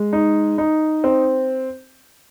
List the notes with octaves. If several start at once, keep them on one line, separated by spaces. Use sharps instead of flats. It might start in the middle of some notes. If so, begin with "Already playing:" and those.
Already playing: G#3
D#4
D#4
C4